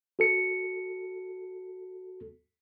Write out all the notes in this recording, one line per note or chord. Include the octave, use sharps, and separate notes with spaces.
F#4 A4 C#7